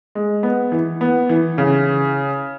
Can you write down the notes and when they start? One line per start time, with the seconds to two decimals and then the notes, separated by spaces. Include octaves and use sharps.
0.15 G#3
0.43 B3
0.72 E3
1.01 B3
1.29 E3
1.58 C#3